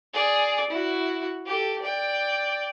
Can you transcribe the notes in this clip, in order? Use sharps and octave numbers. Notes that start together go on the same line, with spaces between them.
G#4 D5
E4 F#4
G4 A4
D5 G5